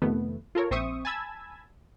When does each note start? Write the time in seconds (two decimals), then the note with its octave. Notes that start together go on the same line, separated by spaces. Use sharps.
0.02 F2 C3 D#3 A3 B3
0.55 F4 A4 A#4 C#5
0.71 A#1 C4 C5 E5 C#6 D#6
1.05 G#5 A5 B5 E6 G#6